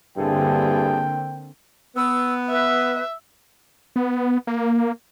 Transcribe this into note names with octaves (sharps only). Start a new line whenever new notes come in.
G2 D3 A#3 C4 E4 G#4 A4 G5
B3 E6
B4 E5
B3
A#3